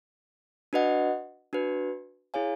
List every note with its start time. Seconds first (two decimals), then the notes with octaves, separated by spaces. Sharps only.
0.73 D4 F#4 B4 D#5 F#5
1.53 D4 F#4 B4
2.34 E4 G#4 C#5 F5 G#5